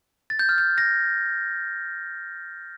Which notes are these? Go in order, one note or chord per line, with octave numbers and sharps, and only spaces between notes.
A6
G6
F6
G6
A#6